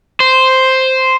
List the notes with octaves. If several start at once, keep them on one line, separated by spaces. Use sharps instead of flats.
C5